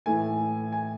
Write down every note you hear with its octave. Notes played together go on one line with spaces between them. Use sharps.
A2 E3 A3 G#5
G#5